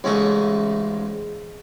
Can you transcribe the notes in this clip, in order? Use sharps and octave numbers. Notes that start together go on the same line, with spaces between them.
A1 G#2 C#3 A3 D#5 C#6